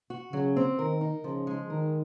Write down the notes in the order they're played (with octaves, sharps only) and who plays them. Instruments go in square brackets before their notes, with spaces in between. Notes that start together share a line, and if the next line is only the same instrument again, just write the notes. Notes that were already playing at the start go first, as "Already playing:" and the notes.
[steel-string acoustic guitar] F#4
[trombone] C#3 [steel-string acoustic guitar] F#3
[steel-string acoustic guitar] C4
[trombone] D#3 [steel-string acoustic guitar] A#4
[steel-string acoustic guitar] D#4
[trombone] C#3 [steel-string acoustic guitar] F3
[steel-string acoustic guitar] G#3
[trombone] D#3 [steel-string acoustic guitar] A#4